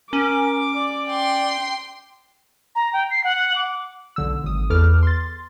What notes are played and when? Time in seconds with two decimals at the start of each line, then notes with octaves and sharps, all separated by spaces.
0.13 C#4 A#4 D6
0.76 D5
1.09 G5 C6
2.75 A#5
2.93 G5
3.11 C7
3.24 F#5
3.56 D6
4.16 B1 D3 E6
4.44 G#1 D#6
4.70 E2 A4 B4 D6 F6
5.03 C6 A6